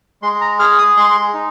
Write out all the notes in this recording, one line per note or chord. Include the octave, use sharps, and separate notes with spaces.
G#3 C6
A#5
G#4 F6
D#6
G#3 C6
D#4